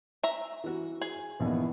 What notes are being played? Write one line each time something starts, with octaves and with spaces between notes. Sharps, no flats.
E5 A#5
E3 F#4
G#4
A#1 D#2 E3 B3